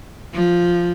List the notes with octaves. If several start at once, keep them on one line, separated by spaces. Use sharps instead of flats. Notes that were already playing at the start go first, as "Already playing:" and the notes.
F3